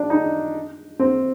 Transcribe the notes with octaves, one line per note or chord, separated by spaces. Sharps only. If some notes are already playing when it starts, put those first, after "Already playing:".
Already playing: D4
D#4
C4